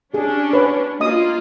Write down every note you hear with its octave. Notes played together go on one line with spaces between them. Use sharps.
C#4 D4 G4 G#4
B4 C#5
A#3 F4 F#4 D#5 D#6